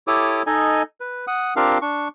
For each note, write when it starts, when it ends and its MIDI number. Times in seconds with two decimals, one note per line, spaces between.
0.07 0.42 64
0.07 0.42 67
0.07 0.42 69
0.07 0.42 73
0.07 0.42 86
0.07 0.42 87
0.47 0.82 63
0.47 0.82 69
0.47 0.82 75
0.47 0.82 80
1.00 1.25 71
1.27 1.54 78
1.27 1.54 87
1.56 1.78 60
1.56 1.78 62
1.56 1.78 65
1.56 1.78 67
1.56 1.78 70
1.56 1.78 77
1.82 2.08 62
1.82 2.08 85